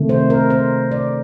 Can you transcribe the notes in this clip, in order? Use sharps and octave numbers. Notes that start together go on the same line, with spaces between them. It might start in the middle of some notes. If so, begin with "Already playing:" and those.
Already playing: C3 D#3 A3
C5
A#4
C5
D5